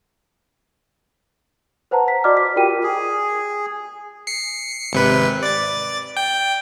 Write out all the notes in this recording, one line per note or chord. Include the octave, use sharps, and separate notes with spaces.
B4 C5 F#5 A5 A#5
B6
F#4 D5 D#5 D6 F6
B6
F4 G4 A#4 G5 D#7
G#4
C7 C#7
G#1 C3 B4
D5 A6
G5